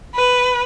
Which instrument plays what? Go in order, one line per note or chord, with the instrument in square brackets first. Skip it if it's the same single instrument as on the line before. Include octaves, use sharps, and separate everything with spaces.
[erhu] B4